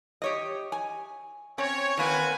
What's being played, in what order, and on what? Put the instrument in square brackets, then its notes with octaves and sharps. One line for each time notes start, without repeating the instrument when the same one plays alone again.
[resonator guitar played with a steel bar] G4 C#5 D#5
G#5
[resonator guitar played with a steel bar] C4 C#4 [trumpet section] C#5
[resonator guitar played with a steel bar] D#3 A#3 C4 [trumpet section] F#4 B4 G#5